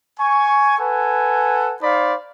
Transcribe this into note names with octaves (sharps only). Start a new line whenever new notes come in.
G#5 C#6
A4 B4 F#5 G#5
D#4 C5 D5 F5 B5